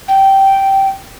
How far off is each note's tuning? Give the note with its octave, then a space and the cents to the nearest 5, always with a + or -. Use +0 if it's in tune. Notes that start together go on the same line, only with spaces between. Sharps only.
G5 -10